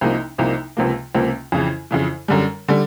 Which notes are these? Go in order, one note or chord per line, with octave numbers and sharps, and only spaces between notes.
C2 C3 F3 A#3 D#4
C2 C3 F3 A#3 D#4
C#2 C3 F3 A#3
C#2 C3 F3 A#3
F2 C#3 E3
F2 C#3 E3
F#2 D3 G3
D3 G3